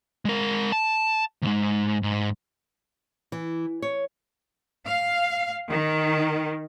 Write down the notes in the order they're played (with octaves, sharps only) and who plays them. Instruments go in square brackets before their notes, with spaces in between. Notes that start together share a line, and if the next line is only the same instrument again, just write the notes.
[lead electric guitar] G#3 A#4
A5
D2 G#2
G#2
[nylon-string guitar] E3
C#5
[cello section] F5
D#3